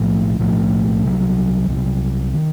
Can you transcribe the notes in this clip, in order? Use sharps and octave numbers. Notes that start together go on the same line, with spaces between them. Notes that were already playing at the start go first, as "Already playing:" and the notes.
Already playing: B1 A2 F3 A3
B1 A2 F3 A3
C2 C3 D#3 F#3
C2 C3 D#3 F#3
D#3